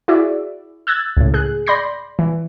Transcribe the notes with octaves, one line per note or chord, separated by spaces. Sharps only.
E4 F#4 G#4 D5 E5
E6 F#6 G#6 A6
C#2 A2
G#4 F#6
D5 B5 C6 G6 A#6 C7
E3